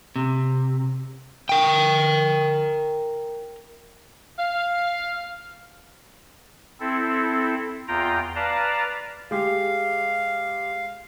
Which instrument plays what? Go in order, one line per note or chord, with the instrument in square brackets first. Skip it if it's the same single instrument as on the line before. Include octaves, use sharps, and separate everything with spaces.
[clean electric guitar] C3
[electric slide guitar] A#4 G5
[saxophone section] F5
[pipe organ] C4 E4 A4
E2 F4 G5 A#5
B4 D5 F5 A5 A#5
[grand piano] G#3 G4 [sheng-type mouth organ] F5